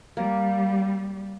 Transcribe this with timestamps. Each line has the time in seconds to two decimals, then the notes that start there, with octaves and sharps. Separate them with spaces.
0.17 G3 A#3